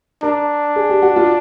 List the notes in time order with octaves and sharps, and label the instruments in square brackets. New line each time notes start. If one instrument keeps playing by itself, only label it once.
[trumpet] D4 [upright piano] A#4
[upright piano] G#4
G4
F#4
F4